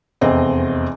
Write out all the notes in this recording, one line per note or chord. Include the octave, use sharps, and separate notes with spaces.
F1 E2 C4 D#5